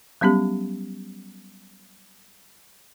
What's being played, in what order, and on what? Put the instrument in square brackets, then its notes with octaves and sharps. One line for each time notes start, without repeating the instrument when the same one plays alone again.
[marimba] F#3 G3 B3 C#4 G4